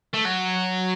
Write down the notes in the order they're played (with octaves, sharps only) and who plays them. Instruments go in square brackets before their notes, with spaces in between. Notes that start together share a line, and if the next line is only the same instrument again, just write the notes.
[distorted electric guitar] A3
F#3